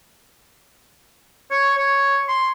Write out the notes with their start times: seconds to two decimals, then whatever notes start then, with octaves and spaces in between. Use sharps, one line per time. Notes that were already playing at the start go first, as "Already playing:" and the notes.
1.51 C#5
1.76 C#5
2.28 C6